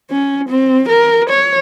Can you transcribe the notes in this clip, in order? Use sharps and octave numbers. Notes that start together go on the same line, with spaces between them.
C#4
C4
A#4
C#5